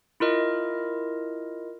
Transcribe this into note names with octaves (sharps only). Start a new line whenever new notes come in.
E4 F4 A#4 D#5